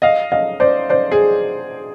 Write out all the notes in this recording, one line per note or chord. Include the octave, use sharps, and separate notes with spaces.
D#5 F5
D#5 F5
C5 D5
C5 D5
G#4